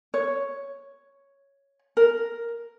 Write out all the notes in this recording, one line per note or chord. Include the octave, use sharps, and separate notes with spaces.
C#5
A#4